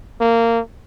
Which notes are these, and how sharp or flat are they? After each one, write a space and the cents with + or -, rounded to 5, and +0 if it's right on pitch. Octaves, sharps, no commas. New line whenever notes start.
A#3 -20